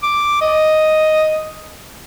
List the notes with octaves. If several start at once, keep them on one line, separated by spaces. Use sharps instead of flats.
D6
D#5